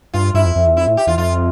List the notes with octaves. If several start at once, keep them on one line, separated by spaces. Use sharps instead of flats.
G2 F4
G2 E4
F2
F2
E2
F2 E4
A2
G4
E2 F4
F2 F4